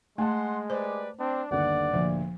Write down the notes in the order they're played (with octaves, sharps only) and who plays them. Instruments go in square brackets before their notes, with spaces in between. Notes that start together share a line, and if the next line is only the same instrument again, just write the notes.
[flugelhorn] G#3 [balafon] A3 [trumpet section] F#5 C6 [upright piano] G#5 A5
[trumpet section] G4 B4 D5 [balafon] C5
[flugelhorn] C4 [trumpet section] D4
[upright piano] G1 D#2 D3 [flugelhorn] D5 [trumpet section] F#5
[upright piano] D2 A#2 [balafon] F3